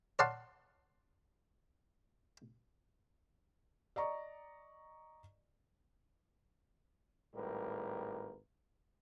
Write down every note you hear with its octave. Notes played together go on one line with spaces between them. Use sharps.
C#5 D5 F5 F#5 A5 C6
D5 D#5 A#5 C#6
G#1 A2 G3 A#4 B4